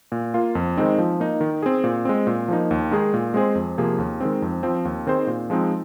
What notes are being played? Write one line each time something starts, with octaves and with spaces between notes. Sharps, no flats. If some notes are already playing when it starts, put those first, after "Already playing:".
A#2
A#3 F4
F2
D#3 G#3 C4 D#4
F3
A#3 D#4
D#3
C4 G#4
A#2
G#3 C4
A#2
F3 A#3 D#4
D#2
D#3 G#3 D#4 G#4
A#2
G#3 C4 G#4 C5
F2
C3 F3 A#3 G#4
D#2
D#3 G#3 C4
F2
F3 C4
D#2
D#3 C4 G#4 C5
A#2
F3 G#3 C4 D#4